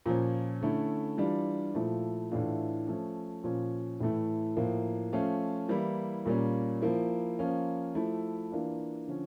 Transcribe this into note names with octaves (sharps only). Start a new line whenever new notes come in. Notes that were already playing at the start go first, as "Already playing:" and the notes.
A#2 F3 C#4
D3 A3 C#4 E4
E3 G3 D4 F4
A#2 F3 A3 E4
A2 E3 A3 D4 F4
F3 A3 C#4
A#2 F3 C#4
A2 E3 A3 E4
A2 F3 A#3
F3 A3 C#4 F4
E3 G3 A#3 E4
A#2 G3 A#3 C#4
F3 A#3 E4
F3 A#3 C#4 F4
F3 A3 E4
E3 A#3 D4 F4
D3 F3 C#4